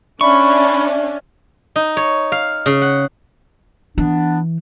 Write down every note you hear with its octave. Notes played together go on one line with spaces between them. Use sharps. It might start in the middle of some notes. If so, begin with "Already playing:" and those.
C#4 D4 D5 E5 B5 C#6
D#4
C#5
F5
C#3
F#5
E3 B3 D4